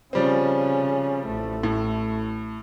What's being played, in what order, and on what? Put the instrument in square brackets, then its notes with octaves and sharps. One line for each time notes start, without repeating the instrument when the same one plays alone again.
[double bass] C#3 C#4 [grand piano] F3 G3 C4
[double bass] A1 A3
[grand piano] A2